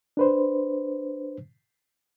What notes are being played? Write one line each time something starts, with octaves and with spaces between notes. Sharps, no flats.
D4 B4 C5